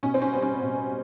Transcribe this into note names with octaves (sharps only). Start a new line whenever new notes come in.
B2 C#4
C4
C#4
G3 B3
C#4
B2